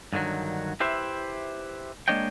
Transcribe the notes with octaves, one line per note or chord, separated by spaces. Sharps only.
G2 D3 D#3 F#3
E4 G4 B4 C5 E5
G#3 A#3 D4 C#5 D#5 G5